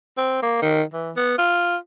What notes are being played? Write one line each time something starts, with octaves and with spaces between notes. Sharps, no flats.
C4
A#3
D#3
E3
B3
F4